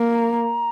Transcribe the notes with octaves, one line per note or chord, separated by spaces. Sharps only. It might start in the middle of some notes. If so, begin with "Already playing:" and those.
Already playing: A#3
A#5